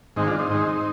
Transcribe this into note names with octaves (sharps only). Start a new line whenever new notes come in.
G#2 D#3 G#3 C4 D#4
D4 F4
C4 D#4
G#2 D#3 G#3